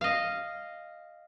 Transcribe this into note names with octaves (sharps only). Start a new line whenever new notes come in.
D#5 F5